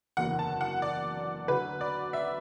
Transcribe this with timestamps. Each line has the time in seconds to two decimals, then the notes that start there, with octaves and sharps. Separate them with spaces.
0.17 F#1 E2 D3 F#3 F#5
0.39 A5
0.61 F#5
0.82 D5
1.48 D2 D3 F#3 B4
1.81 D5
2.13 E5